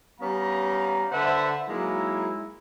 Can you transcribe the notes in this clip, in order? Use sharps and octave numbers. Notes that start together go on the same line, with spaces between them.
G3 B3 C#4 F5 A#5
D3 B4 C5 E5 F#5 A5
F#3 G#3 A#3 D#4 E4